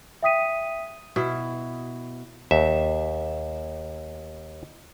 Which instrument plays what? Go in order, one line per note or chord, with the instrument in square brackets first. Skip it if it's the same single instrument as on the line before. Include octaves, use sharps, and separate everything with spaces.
[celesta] E5 G5 D#6 B6 D#7
[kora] B2 E4
[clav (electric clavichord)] D#2 E5